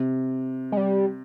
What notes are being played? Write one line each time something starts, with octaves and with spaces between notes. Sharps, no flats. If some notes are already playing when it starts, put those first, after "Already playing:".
Already playing: C3
G#3
G3